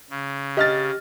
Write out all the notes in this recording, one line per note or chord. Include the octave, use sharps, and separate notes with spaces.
C#3
G4 D#5 F6 A6